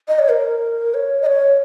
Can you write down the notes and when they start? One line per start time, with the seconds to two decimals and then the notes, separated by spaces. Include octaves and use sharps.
0.08 D#5
0.19 C#5
0.30 A#4
0.94 C#5
1.22 D#5
1.26 C#5